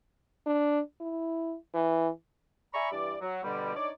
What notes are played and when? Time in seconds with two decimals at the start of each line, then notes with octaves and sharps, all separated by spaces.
0.46 D4
1.01 E4
1.74 E3
2.73 D5 E5 G#5 A#5 B5 C#6
2.91 G2 E3 G3 D5
3.21 F#3
3.44 B2 D3 G3
3.75 D4 D#4 C#5 D5